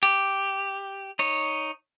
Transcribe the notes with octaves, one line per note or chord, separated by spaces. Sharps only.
G4
D#4 C#5